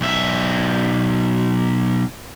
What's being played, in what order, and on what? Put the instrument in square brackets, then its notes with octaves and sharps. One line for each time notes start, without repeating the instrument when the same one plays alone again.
[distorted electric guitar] B1 E5